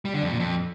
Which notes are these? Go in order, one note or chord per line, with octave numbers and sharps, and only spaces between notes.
G3
D3
F2
A#2
F2